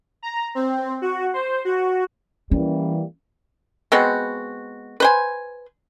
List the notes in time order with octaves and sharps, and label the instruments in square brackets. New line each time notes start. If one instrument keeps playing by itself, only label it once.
[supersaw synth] A#5
C4
F#4
C5
F#4
[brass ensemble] E3 G3 A#3 [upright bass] C#4
[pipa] G#3 B3 C4 F#4
B4 C5 G#5